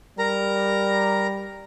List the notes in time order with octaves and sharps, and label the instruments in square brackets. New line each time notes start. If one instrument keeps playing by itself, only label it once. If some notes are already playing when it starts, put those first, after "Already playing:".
[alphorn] G3 [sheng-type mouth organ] A#4 A#5